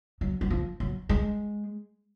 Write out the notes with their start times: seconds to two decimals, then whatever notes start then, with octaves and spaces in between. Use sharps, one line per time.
0.21 F#3
0.41 F#3
0.51 F3
0.80 F#3
1.09 G#3